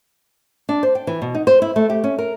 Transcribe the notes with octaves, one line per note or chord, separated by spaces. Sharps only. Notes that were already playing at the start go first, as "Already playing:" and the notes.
D4
C5
G5
E3
B2
D#4
C5
E4
A3
G4
C#4
A#4